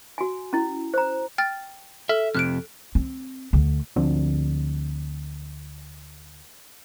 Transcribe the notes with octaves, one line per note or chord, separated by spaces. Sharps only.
F#4 G#5
C#4 E4
C5 A#5
G5 F6 A6
A4 E5 F6
F2 C3 F6 F#6 D7
C4
D2 D3
D2 F3 C4 D4